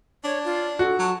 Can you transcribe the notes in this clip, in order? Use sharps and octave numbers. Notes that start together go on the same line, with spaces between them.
D4 C#5
F4
F#4 A4
F#3 A5